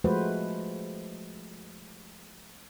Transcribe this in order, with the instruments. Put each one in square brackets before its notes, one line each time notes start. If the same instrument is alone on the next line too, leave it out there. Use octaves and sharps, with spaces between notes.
[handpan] F3 G#3 A3 F#4 B4 C5